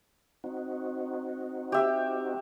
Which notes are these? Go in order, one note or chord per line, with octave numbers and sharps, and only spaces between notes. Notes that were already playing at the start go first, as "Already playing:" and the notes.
C4 D#4 F#4
G4 E5